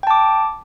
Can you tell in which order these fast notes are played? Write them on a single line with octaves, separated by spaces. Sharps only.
G5 A5 D6